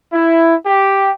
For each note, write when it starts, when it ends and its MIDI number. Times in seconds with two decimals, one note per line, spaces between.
0.12 0.54 64
0.66 1.10 67